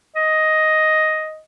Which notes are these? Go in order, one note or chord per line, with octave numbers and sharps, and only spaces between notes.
D#5